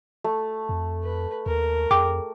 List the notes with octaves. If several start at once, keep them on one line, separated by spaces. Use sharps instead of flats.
A3
F2
B4
D#2 A#4
F2 G#4 G5 D6